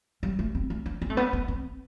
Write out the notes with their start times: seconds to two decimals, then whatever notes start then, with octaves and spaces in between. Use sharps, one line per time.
0.23 G3
0.39 A3
0.55 C4
0.70 A3
0.86 D4
1.02 C4
1.10 A3
1.17 B3
1.33 B3
1.48 C4